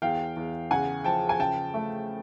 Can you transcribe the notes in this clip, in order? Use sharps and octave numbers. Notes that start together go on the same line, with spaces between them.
E2 F5 G5
E2
C#3 F#5 G#5
F3 G5 A5
G#5
C#3 G5 A5
A3